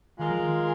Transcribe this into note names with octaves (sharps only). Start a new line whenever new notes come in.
D#3 G#3 F4 A#4
F3
D#3